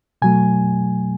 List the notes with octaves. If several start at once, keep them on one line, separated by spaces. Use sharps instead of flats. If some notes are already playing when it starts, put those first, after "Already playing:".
B2 F#3 A3 G#5